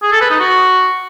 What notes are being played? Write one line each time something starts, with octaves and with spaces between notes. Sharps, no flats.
G#4
A4
B4
D#4
F#4